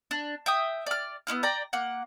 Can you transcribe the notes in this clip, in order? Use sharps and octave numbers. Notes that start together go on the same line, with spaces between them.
D4
E5 G5 D#6
D5 F6
B3 C#4 E4 F6
D5 G5 A#5
A#3 F#5